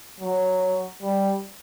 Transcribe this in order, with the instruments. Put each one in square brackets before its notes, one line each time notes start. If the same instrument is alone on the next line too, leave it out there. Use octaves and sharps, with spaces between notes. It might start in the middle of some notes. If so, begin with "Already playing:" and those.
[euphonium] F#3
G3